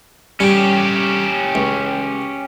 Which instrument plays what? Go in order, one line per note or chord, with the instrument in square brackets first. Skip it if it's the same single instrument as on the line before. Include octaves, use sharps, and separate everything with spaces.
[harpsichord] G3 [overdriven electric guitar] C#4 G4
[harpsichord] C#2